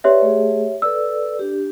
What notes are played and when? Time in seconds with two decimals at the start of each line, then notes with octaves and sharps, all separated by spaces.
0.04 G4 B4 C#5 D5 E5
0.22 A3 G#4
0.82 A4 B4 D5 E6
1.39 D4 G4